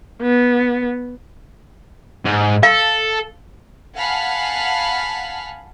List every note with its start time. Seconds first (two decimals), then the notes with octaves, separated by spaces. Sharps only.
0.22 B3
2.25 G#2
2.63 A4 F5
3.96 F5 F#5 G#5 A5 B5 F6